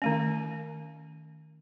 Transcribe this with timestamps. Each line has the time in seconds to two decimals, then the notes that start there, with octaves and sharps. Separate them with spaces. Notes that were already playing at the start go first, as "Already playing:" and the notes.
0.02 D#3 A3 C#4